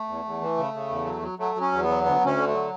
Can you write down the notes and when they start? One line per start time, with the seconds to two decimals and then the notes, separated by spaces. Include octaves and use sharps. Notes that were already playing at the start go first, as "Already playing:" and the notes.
Already playing: A3
0.08 E2
0.25 E2
0.41 E3
0.57 C#3
0.74 C#3
0.90 E2
1.06 F#3
1.22 F#3
1.39 F#3 A3
1.55 F#3
1.61 C#4
1.72 E2
1.83 B3
1.88 F#3
2.03 D2 B3
2.21 D2 C#4
2.37 D3
2.47 A3
2.53 F#3